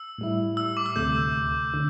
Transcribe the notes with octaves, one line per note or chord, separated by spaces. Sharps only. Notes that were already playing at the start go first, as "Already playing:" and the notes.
Already playing: E6
A2 G3 E4
E6
D6
E6
D2 C3 A3 G6
D3